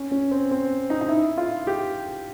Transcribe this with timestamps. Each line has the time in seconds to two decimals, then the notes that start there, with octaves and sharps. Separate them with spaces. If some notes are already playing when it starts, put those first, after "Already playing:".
Already playing: C#4
0.11 C#4
0.31 C4
0.51 C4
0.90 D#4
1.01 D#4
1.08 E4
1.37 F4
1.67 G4